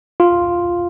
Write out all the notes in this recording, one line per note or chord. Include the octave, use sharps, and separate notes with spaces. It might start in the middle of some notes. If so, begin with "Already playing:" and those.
F4